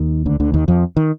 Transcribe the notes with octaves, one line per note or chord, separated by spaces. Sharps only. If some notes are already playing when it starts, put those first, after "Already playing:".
Already playing: D#2 D#3
D2 D3
D2 D3
D#2 D#3
F2 F3
D#3